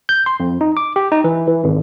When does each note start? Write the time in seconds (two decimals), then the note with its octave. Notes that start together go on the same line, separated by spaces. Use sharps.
0.09 G6
0.26 C6
0.40 F2
0.61 D#4
0.77 D6
0.96 G4
1.12 D#4
1.24 E3
1.47 E3
1.64 G#1